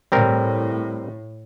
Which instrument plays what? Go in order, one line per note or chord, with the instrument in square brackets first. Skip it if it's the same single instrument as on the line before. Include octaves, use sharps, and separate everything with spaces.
[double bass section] A2 [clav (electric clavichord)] G3 C4 A#4